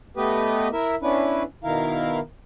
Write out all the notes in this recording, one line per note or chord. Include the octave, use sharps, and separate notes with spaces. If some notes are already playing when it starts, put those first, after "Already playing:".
A3 B3 G4 B4 D#5
E4 A#4 E5
B3 C#4 D4 E4 B4
B2 D#3 E4 A#4 F5